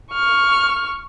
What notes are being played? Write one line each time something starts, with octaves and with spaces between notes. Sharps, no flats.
C#6 F6